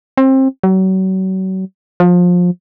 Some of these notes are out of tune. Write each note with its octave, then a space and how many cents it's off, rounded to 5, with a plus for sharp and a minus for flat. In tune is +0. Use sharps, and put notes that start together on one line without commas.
C4 +25
F#3 +35
F3 +25